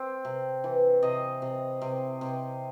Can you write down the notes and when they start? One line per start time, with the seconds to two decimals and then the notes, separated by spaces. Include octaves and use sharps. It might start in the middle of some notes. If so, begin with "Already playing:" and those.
Already playing: C4
0.25 C3
0.64 E3
1.03 C3 D#5
1.42 C3
1.81 C3
2.21 C3